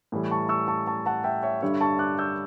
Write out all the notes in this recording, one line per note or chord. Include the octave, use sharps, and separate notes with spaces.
A2 E3 G3
A5 C#6
C#6 E6
A5 C#6
A5 C#6
F#5 A5
E5 G5
C#5 E5
G2 D3 G3 C#5 E5
A5 C#6
D6 F#6
E6 G6